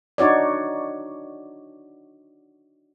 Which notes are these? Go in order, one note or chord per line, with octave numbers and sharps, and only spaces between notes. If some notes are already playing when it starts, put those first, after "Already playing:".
D4 D#4 F#4 C#5 D5